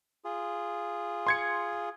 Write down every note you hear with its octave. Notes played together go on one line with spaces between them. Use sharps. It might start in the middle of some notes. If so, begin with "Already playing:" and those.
F4 G#4
C6 G#6 C#7